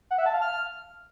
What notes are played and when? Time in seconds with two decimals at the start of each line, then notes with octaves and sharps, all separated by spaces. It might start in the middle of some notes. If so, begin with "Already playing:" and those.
0.11 F#5
0.18 E5
0.26 A5
0.34 F5
0.42 F6